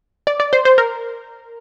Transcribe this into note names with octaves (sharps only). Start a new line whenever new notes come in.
D5
D5
C5
C5
A#4